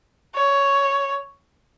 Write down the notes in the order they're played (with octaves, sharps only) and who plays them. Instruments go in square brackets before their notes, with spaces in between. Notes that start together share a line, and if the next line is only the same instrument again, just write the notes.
[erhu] C#5